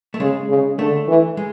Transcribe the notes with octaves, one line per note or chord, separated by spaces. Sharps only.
A3
C#3 G#3
C#3
D3 A3
E3
G#3